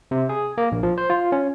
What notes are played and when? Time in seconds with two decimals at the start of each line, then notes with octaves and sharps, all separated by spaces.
0.11 C3
0.29 G#4
0.58 A#3
0.72 A#1
0.83 F3
0.98 C5
1.10 F4
1.32 C#4